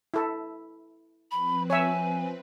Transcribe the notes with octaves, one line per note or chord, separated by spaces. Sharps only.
E4 A4
F3 C4 B4 B5
C#5 E5 G#5